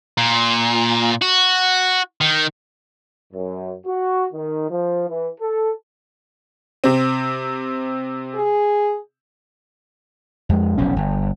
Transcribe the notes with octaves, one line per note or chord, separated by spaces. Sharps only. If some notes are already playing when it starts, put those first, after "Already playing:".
A#2
F#4
D#3
F#2
F#4
D#3
F3
E3
A4
C3 C4
G#4
F2 G#3
F1 B1 C#4
G1